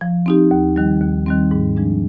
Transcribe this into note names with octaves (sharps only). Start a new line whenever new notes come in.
F3
C4 D#4 G4
D#2
D#3 G3
D#2
D#3 G3 C4
G#2
F3 G#3 D4